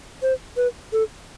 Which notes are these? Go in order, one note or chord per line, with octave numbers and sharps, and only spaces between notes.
C5
B4
A4